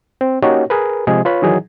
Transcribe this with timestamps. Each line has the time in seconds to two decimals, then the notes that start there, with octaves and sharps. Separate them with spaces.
0.21 C4
0.42 A#3 C#4 D#4 F#4 G4 C#5
0.70 G#4 A#4 B4
1.07 C3 F3 G#3 G#4
1.25 F4 B4 C#5 B5
1.42 D#3 E3 F#3 D#4 G#4